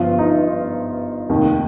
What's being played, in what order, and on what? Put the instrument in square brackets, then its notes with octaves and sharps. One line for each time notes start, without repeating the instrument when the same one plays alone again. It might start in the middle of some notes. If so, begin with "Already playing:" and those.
Already playing: [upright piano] G1 G2 F3 F4
D#4
F1 D#2 D#3